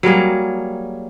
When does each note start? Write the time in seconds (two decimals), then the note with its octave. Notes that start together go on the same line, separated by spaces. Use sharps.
0.03 F#3 G3 A#3 G#4